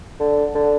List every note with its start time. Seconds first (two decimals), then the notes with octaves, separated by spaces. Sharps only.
0.20 D3
0.55 D3